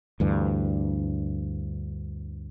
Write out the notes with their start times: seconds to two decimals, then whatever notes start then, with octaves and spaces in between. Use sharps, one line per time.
0.20 D2 G2 E3